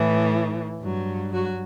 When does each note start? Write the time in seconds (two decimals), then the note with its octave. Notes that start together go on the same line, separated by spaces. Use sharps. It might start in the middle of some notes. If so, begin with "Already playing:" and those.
Already playing: A2 E3
0.80 G2 F#3
1.33 F#3 F#4